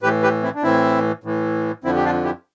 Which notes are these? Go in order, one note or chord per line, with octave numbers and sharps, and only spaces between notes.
A2 E3 G4 B4
G4 B4
C4 E4
D4
A2 E3 C4 E4
A2 E3
F2 D3 F3 C4 E4
G4
D4 F4
E4 G4